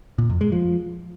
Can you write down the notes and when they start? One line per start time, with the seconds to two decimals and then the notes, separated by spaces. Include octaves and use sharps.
0.18 A#2
0.30 F2
0.41 G#3
0.52 F3